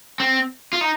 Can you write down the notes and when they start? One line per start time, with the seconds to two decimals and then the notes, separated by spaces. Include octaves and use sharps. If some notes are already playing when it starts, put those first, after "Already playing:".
0.20 C4
0.73 F4
0.81 D#4